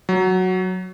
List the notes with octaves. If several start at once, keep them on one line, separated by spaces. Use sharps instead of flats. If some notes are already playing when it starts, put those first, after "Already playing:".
F#3